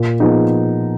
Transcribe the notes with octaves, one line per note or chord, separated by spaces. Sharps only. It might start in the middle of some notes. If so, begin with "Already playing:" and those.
Already playing: A#2
F3 B3 D#4 G#4